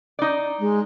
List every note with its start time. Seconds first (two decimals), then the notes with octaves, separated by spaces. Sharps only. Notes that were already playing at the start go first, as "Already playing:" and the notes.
0.19 D#4 D5
0.59 G#3